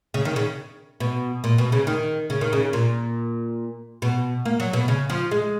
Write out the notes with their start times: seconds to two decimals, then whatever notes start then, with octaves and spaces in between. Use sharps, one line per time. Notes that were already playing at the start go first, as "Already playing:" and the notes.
0.14 C#3
0.25 D#3
0.36 C#3
1.00 B2
1.44 A#2
1.58 B2
1.72 C#3
1.87 D#3
2.30 C#3
2.41 D#3
2.53 C#3
2.73 A#2
4.02 B2
4.45 A#3
4.60 F#3
4.73 B2
4.88 C#3
5.10 F3
5.31 G#3